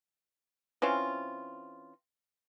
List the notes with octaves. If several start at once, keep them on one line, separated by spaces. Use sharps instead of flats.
E3 C4 C#4 F4